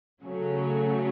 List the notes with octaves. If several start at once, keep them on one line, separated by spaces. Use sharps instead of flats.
C#3 F#3 A3 C#4